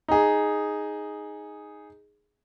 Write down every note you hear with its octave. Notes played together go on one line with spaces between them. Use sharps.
D#4 G#4